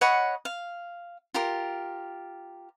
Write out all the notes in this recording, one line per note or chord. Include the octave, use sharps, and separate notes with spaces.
C#5 D#5 F#5 B5
F5
F4 G4 A#4